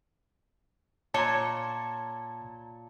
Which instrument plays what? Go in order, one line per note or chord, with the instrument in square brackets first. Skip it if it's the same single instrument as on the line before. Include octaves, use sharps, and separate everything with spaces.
[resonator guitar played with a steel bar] A#2 C#5 [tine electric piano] A5 A#5